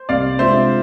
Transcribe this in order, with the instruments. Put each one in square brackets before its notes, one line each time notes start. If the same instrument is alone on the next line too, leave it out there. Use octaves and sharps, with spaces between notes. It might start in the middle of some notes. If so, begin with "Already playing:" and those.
Already playing: [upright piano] C5
[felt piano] C2 [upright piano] D5 F5
[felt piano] C3 G#3 D4 F4 [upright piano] C5 E5